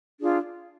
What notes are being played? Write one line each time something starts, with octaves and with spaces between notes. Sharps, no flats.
D4 F4 G#4